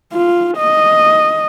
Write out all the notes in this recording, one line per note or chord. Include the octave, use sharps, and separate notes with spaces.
F4
D#5